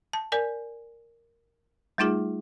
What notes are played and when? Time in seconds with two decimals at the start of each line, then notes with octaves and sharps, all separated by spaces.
0.13 A5
0.32 A#4 D5 G#5
1.98 G3 A3 D#4 F4 G#4